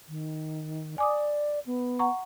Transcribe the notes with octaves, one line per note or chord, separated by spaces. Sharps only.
D#3
D5 G#5 D6 D#6
B3
F#5 A#5 C#6